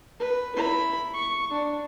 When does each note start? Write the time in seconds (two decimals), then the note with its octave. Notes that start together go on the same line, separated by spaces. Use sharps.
0.20 B4
0.56 E4 B5
1.14 C#6
1.50 D4